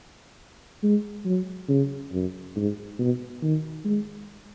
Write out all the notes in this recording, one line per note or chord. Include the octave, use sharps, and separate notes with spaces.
G#3
F#3
C#3
F#2
G#2
B2
D#3
G#3